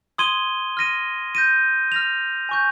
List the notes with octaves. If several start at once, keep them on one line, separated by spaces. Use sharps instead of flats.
C6 D#6 G#6 D#7 G7
F6 A#6 D#7
G6 A#6 D#7
F6 A#6 F7
G#5 C#6 G6